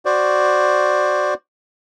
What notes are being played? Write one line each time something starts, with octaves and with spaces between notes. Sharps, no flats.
F#4 C5 D5